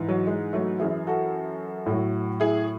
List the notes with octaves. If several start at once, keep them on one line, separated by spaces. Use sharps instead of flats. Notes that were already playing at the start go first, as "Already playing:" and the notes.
Already playing: G#2 E3
F#3
G#3
F#3 A3
F#2 E3 E4 G#4
F#4 A4
A2 F#3
E4 G#4